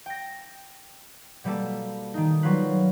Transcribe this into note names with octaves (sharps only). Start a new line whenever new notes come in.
G5 A#6
B2 G3 A#3 A4
D#3 D#4
F#3 G3 F4 B4